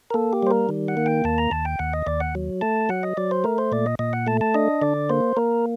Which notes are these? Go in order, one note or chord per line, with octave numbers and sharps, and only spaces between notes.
A#4
A#3 A4
G4
G3 C5
A#4
D#3
F#5
A#3
G5
D#2 A5
A#5
D#2 A5
G5
D#2 F#5
D#5
D#2 D5
F#5
F#3
A3 A5
F#3 F#5
D#5
F#3 D5
C5
A3 A#4
C5
A#2 D5
D#5
A#2 D#5
F#5
A3 A5
A5
D4 D#5
D3 D5
A#3 C5
A#3 A#4